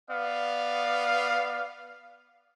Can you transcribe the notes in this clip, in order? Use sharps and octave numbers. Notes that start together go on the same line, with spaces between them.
B3 D5 F5